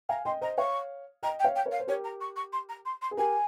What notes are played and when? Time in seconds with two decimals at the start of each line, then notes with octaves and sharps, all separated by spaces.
0.09 F5 G#5 A#5
0.25 D#5 G5 C6
0.41 C5 D#5 A#5
0.58 C#5 F5 C#6
1.23 D#5 G5 A#5
1.39 G5
1.44 C#5 F5
1.55 G5
1.65 A#4 C#5
1.71 F5
1.80 C5
1.87 G4 A#4 C#5
2.04 A#5
2.20 C#6
2.36 C#6
2.52 C6
2.69 A#5
2.85 C6
3.01 C6
3.11 G#4
3.17 G4 A#4 G#5